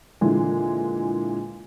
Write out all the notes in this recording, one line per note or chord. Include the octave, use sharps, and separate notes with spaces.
A#2 D3 E3 G#3